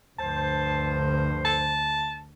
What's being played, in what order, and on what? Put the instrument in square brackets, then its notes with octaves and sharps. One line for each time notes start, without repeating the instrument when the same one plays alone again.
[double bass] D2 [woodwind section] G2 F3 C5 [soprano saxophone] A5
[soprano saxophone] A5